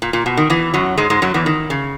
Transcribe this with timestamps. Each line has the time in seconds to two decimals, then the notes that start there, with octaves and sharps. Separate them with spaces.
0.02 A#2
0.13 A#2
0.26 B2
0.37 D#3
0.50 E2 E3
0.74 F#2 F#3
0.97 G#2 G#3
1.10 G#2 G#3
1.22 F#2 F#3
1.34 E2 E3
1.46 D#3
1.70 C#3